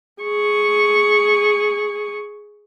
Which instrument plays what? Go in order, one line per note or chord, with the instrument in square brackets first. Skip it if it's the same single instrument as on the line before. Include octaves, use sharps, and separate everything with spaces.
[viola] G#4 C#6